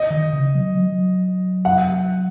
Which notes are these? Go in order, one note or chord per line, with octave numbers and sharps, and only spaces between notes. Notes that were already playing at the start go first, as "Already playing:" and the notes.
Already playing: D#5
D#3
C#3
F#3
F#3
F#5